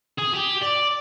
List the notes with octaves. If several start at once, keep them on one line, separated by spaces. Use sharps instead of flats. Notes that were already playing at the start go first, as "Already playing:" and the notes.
G#4
G4
D5